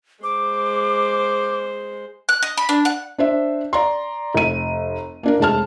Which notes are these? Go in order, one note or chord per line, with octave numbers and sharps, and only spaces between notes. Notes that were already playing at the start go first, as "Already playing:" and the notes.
G#3 C5 D6
F#6
D#5
B5
D4
F#5
D4 C5 E5
D5 A#5 C6
F1 D#7
A#3 D4 A#4
F1 G#3 A5 F6